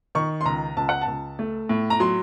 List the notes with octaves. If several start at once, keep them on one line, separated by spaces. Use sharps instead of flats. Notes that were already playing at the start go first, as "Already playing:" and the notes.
D#3 C#6
C6
C#2 A#5
C#2 A5
F#5
A5
C#2
A3
A2
A#5
F#3 C6